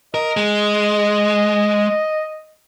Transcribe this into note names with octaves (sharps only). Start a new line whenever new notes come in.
A#4 D#5
G#3